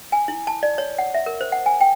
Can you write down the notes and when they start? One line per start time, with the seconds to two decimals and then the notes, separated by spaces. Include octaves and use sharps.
0.12 G#5
0.28 E4
0.47 A5
0.63 D5
0.78 C#5
0.98 F#5
1.14 E5
1.26 A#4
1.41 C5
1.52 F#5
1.66 G#5
1.81 G5